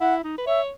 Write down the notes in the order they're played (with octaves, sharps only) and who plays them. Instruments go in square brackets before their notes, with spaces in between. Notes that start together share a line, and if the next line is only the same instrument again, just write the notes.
[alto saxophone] E4 [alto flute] F#5
[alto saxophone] D#4
B4
[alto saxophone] C#5 [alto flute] E5